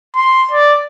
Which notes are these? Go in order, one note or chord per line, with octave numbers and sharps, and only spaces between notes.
C6
D5